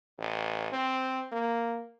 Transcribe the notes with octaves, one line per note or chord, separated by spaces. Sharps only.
A1
C4
A#3